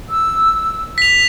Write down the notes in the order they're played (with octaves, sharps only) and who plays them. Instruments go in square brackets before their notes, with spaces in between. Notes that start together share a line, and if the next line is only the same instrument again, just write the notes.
[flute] E6
[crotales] B6 F7